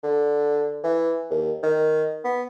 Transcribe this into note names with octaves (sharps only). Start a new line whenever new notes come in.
D3
E3
D#2
D#3
B3